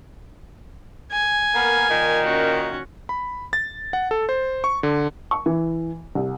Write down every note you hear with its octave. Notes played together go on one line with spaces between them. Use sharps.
G#5
A#3 B3 A#4
A#2 D#3
C#4 F#4
B5
A6
F#5
A4
C5
C#6
D3
C#6
E3
C2